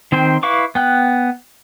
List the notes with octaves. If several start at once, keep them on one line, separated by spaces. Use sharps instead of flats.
D#3 C4 C5 G5
E4 B4 F5 C#6 D6
B3 G5 F#6